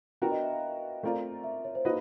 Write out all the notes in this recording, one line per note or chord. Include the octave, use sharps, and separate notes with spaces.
B3 D4 F#4 A#4 G5
D#5
E5
F5
A3 C4 F4 A#4 D5
E5
C#5
C5
A#3 D#4 F#4 B4 D#5